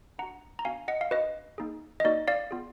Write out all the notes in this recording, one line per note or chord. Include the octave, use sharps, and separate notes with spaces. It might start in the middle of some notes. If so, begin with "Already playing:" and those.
D4 F#4 F#5 A#5
A#5
B3 D4 F#4 F5 G#5
D#5 F#5
F5
D4 F#4 B4 D#5
A#3 D#4 G#4
D#5
A#3 D#4 F#4 D5
D5 F5
B3 F4 G#4